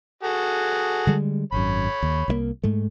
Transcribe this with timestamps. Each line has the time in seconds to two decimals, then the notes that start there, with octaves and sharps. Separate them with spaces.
0.23 F#4 G#4 A4
1.07 D3 G3 G#3
1.52 G#1 F#2 C#5 B5
2.03 D#2
2.28 C2 D3 A#3
2.64 G#2 G#3 A3